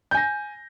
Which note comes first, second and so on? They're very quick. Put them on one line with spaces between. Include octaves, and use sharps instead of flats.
G6 G#5 A#6